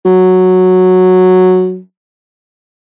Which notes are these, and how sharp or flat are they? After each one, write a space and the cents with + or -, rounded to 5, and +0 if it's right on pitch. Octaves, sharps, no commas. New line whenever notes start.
F#3 -5